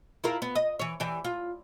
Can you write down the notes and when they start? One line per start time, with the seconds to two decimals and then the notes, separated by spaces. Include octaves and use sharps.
0.24 E4 F4 A#4
0.42 B3
0.55 D#5
0.79 E3 C#5
1.00 E3 G4 D5
1.25 F4